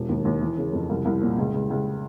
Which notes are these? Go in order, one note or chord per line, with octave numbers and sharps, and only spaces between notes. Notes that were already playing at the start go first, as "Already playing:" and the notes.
Already playing: E1
D#2
D#2
E3
C#3
F2
C2
C2
A#2
C#2
C#2
C#2